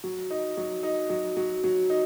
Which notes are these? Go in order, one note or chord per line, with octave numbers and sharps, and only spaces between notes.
F#3
D#4
F#3
D#4
F#3
F#3
F#3
D#4